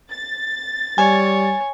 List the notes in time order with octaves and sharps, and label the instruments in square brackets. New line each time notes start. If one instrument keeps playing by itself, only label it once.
[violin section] A6
[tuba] G3 [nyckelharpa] C#5 [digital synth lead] G#5